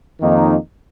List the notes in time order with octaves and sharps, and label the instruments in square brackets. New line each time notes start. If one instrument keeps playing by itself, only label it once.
[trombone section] F2 D#3 A#3 D#4